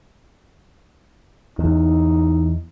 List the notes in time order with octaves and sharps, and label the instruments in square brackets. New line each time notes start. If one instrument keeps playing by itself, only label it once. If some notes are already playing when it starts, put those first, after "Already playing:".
[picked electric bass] E2 [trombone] D#4